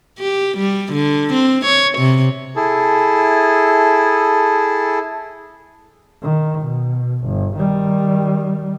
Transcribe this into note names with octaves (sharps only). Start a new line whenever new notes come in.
G4
G3
D3
C4
C#5
C3
E4 G#4 A4
D#3
B2
G1
D#3 G3